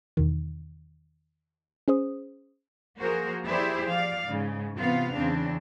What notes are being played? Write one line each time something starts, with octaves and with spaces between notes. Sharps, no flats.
E2 B2 D#3
C#4 G#4 C5 D#6
F3 A#3 F#4 G#4 A#4 C5
E4 G4 G#4 C5 D5 E5
F3 D5 F5
G#2 C#3
C3 E3 B3 F4 F5
E2 C#3 C4 D4